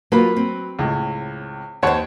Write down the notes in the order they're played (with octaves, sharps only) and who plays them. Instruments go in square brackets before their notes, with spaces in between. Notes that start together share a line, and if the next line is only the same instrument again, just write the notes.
[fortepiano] F#3 B4 B5 [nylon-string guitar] A#3 F4
[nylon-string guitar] C4
[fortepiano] C#2 A2
[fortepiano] D#2 C#5 F#5 [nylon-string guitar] C5 A5